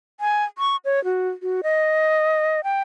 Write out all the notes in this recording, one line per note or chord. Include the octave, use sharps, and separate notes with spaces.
G#5
C#6
C#5
F#4
F#4
D#5
G5